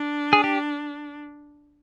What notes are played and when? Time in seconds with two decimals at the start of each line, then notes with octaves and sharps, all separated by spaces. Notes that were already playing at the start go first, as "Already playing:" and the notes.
Already playing: D4
0.33 G#4
0.44 G4